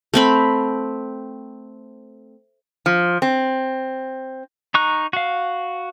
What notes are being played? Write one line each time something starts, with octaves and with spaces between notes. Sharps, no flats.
A3 C4 B5
F3
C4
D#4 A#5 C#6 F#6
F#4 F5